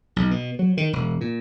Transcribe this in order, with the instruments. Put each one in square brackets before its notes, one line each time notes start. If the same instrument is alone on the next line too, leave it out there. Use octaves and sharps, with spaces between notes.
[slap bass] B1
B2
F#3
D#3
E1
A#2